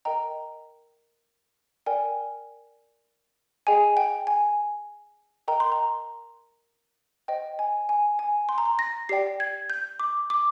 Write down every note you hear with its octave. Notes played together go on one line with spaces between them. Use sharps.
A#4 D#5 G5 A#5
A#4 D5 G5 G#5
G#4 D#5 G5 G#5
G5
G#5
A#4 D#5 G5 A#5
C6
A#5
C5 D#5 G5
G#5
G#5
G#5
C6
A#5
C6
A#6
G4 D5 G5 C7
G#6
G6
D6
D6